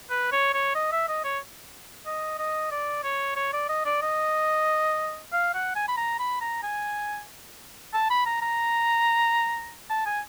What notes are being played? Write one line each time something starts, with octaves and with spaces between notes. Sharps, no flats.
B4
C#5
C#5
D#5
E5
D#5
C#5
D#5
D#5
D5
C#5
C#5
D5
D#5
D5
D#5
F5
F#5
G#5
B5
A#5
B5
A#5
G#5
A5
B5
A#5
A#5
A5
G#5